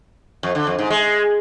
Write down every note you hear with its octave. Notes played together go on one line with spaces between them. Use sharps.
F2
D3
F2
G#2
G#3